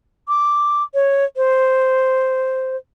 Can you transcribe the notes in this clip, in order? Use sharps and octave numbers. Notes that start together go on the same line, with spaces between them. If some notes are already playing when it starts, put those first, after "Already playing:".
D6
C#5
C5